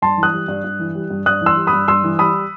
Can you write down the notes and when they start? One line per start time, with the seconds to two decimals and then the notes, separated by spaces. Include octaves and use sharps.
0.02 G2 A5 C6
0.18 E3
0.23 D#6 F#6
0.33 G3
0.48 G2
0.64 G2
0.79 E3
0.95 G3
1.10 G2
1.26 G2 D#6 F#6
1.41 E3 C6 E6
1.57 G3
1.67 B5 D#6
1.73 G2
1.88 G2 C6 E6
2.04 E3
2.19 G3 B5 D#6